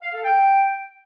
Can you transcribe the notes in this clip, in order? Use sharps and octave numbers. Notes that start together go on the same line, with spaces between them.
F5
A4
G5